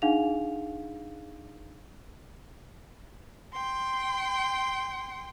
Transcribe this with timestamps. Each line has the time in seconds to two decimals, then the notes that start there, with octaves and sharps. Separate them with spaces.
0.02 D4 D#4 G#4 F5 F#5 F7
3.53 G5 C6